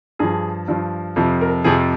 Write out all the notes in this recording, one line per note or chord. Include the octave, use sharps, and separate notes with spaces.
G2 F3 G#4
G2 F3
F2 C3 F3
A#4
F2 C3 F3 G#4